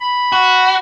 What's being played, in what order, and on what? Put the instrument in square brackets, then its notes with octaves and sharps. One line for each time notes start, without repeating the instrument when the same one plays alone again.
[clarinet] B5
[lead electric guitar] F#4